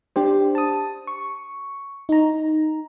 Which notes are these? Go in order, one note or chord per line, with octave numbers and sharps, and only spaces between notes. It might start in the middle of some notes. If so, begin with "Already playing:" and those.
D4 G4 C5
A5 D#6
C#6
D#4 A#5